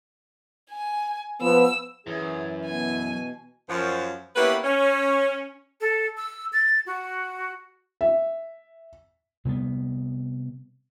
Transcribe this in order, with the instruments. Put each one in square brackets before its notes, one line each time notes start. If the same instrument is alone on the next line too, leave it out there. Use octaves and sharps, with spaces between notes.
[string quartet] G#5
[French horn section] F3 B3 [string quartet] E6
[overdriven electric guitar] F#2 [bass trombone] E3 [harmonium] G#4
[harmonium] B2 [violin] G#5
[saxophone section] F#2 F3
A#3 B3 C#4 E4 G4 B4
C#4
[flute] A4
E6
A6
F#4
[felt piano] E5
[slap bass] C3 G3 G#3 B3